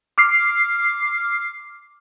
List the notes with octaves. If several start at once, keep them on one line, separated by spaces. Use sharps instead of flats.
D6 F6 C7